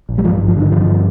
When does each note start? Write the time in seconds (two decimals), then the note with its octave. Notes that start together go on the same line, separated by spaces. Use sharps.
0.09 A#1
0.18 G3
0.24 G2 F3
0.40 G#1
0.48 F3
0.56 D3 D#3
0.72 G2 F3